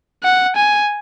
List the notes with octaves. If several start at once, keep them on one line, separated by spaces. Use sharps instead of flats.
F#5
G#5